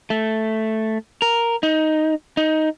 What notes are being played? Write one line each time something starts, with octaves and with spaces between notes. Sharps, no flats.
A3
A#4
D#4
D#4